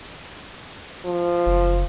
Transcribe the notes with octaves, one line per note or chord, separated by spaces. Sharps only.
F3
F#1